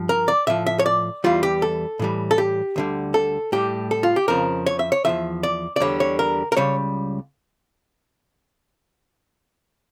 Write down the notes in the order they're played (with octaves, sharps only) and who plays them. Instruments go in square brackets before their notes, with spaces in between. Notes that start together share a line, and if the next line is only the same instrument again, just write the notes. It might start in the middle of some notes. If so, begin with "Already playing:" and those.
Already playing: [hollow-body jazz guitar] G2 F3
A#4
D5
A2 F3 E5
E5
C#5
D5
E2 E3 G3 F4
G4
A4
A2 E3 G3
A4
G4
D2 D3 G3
A4
A2 G3 G4
A4
F4
G4
F2 C#3 F3 A#4
C#5
E5
C#5
C#3 F3 E5
E2
D5
D5
E2 D3 G3 C#5
C#5
A#4
A#4
C#2 C#3 G3 C#5